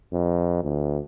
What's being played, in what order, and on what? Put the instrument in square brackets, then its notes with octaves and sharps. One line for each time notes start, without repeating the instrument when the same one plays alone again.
[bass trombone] F2
D2